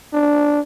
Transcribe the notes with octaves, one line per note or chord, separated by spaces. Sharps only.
D4